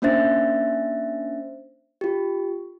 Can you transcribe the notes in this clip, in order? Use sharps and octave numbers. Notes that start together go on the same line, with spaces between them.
A#3 C#4 D4 C5 E5 A6
F4 G4